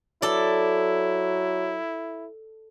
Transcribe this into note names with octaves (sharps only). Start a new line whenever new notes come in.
F#3 E4 A4 D5